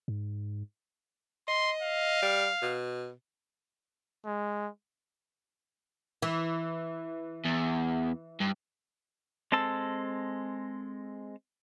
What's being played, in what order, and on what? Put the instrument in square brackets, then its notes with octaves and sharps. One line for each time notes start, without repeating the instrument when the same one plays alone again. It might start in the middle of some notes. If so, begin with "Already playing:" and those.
[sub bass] G#2
[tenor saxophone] D#5 [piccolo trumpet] C6
[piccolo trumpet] F5
[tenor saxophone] G3
B2
[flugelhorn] G#3
[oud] E3
[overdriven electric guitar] E2
G2
[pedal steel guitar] G#3 C4 A4 A5 E6